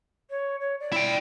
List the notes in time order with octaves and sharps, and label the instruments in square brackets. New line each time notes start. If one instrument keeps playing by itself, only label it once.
[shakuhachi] C#5
C#5
D5
[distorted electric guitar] E4 G5